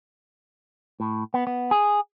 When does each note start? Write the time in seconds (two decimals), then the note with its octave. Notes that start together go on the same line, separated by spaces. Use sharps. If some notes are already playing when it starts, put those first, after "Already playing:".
1.00 A2
1.34 B3
1.47 B3
1.71 G#4